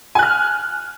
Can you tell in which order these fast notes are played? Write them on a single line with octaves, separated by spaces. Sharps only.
G#5 F#6 F6